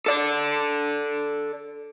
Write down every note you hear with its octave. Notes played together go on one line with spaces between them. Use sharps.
A4 D5